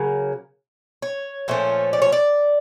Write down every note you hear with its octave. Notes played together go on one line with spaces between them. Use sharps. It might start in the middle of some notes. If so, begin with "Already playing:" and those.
Already playing: C#3 F#3 A#3
C#5
A#2 F3 A3 C#4
D5
C#5
D5